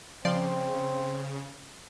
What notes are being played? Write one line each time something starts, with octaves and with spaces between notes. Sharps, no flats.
C#3 F3 C4 D5 C6